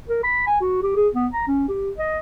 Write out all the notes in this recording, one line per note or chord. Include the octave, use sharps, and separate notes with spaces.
A#4
B5
G#5
F#4
G4
G#4
B3
A#5
C#4
G4
D#5